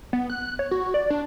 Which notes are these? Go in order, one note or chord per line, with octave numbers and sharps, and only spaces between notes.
B3
F#6
C#5
F#4
D5
D4